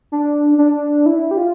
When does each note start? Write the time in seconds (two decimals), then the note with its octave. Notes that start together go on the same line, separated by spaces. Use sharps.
0.12 D4
0.58 D4
1.06 E4
1.31 G4
1.37 F4